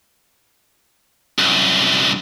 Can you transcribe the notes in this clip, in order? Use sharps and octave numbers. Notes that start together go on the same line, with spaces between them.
C2 F#2